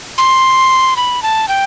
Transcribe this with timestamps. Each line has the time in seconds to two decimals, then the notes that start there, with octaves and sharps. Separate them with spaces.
0.18 C6
0.97 B5
1.22 A5
1.48 G5